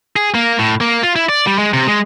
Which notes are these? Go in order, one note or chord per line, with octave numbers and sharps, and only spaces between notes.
G#4
A#3
A2
A#3
F4
E4
D5
G3
G#3
C3
G#3